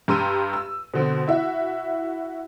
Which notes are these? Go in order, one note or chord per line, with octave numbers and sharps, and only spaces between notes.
G2 G4 A#5 C6 E6 D#7
E6
B2 D3 C4
E4 F#4 E5